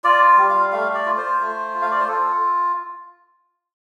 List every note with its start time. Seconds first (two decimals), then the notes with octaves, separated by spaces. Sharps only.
0.04 F4 D5
0.38 G3
0.50 F5
0.72 A3 F5
0.94 D5
1.06 F4
1.18 C5
1.40 A3
1.75 F4
1.82 F5
1.91 D5
2.00 C5
2.08 F4 A4